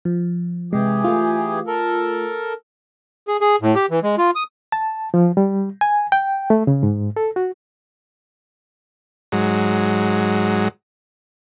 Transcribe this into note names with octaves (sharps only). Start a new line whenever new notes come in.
F3
C3 E3 G#3 G4 G#4
A3 F4
A4 A#4
G#4
G#4
A2
G4
E3
G#3
F4
D#6
A5
F3
G3
G#5
G5
A3
C#3
G#2
A4
F#4
G#2 F#3